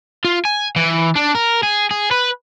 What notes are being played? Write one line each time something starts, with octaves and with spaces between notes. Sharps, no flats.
F4
G#5
E3
D4
A#4
G#4
G#4
B4